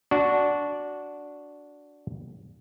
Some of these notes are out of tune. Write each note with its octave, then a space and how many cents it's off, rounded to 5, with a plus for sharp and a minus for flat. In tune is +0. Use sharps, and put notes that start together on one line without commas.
D4 -10 F#4 +0